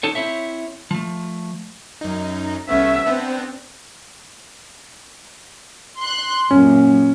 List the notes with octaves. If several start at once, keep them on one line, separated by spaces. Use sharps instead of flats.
D#4 A4 C#5
C4 E4 C#5 E5
F3 A3
F#2 D#4
C2 A3 B3 C#4 E5
B3 C4 D4
C6 F#6
F#2 A#2 C#4